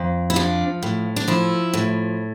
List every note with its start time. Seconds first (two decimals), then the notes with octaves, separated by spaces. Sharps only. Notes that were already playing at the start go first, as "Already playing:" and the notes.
Already playing: F2
0.30 E4
0.36 F3 D4
0.83 A2
1.16 D4
1.28 F3 E4
1.74 A2